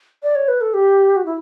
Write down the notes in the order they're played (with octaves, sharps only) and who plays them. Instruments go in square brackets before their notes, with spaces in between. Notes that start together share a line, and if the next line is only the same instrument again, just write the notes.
[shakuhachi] D5
C#5
B4
A4
G4
F#4
E4